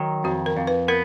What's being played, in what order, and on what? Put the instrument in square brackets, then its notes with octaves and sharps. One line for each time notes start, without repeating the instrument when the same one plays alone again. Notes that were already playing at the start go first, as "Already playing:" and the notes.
Already playing: [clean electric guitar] D#3 F#3
[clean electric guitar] F2 [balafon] F#4
[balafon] A#4
[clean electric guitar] F2
[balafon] B4
[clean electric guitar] B3 [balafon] A#4